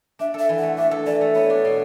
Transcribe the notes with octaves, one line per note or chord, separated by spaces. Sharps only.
D4 E5
A4 E5
E3
F#5
A3
D4 E5
A4
E3 D5
A3
B3 C#5
D4
B2